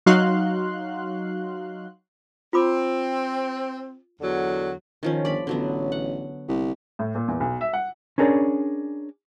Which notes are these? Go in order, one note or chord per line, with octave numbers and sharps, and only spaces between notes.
F#3 D#4 F#4 F5 C6 F#6
C4 F4 B5 D6
E2 D3 F#3
D#3 F3 C#4
G1 D5 B5
A1 D3 F#3 B3
F#5
C2
A2
A#2
E2
B1
E5
F#5
C#4 D4 G#4 A#4 C#5 D5